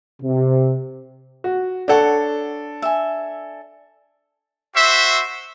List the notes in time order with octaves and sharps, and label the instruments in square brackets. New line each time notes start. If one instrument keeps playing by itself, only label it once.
[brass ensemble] C3
[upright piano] F#4
[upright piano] D4 A4 [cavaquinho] C#5 F#5 C#6
[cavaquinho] E5 G#5
[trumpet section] F#4 C5 E5